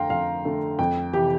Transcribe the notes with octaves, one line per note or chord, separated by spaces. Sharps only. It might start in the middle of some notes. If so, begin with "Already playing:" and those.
Already playing: F2 D3 A3 F5 G5 A#5 C6
F2 F5
D3 A3
F2 G5
C3 E3 G4